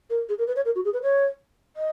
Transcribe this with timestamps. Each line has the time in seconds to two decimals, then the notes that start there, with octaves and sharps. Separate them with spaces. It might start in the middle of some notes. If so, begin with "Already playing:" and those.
0.10 A#4
0.29 G#4
0.38 A#4
0.47 B4
0.56 C#5
0.65 A#4
0.76 F#4
0.85 G#4
0.93 B4
1.03 C#5
1.76 D#5